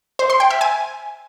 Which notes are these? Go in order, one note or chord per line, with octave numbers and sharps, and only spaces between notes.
C5
C6
G5
E5
G#5